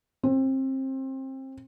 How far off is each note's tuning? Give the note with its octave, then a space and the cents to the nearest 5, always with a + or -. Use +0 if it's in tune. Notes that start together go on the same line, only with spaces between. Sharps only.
C4 +25